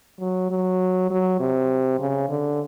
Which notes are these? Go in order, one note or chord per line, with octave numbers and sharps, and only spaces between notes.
F#3
F#3
F#3
C3
C#3
D3